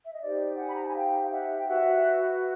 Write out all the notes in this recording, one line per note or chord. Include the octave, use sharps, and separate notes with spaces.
E5
D#5
D#4 G4 C5 D5
F#5 G#5
B5
A#5
A5
G#5
F5 G5
F5
E5 F#5
G5
F#4 B4 E5 F#5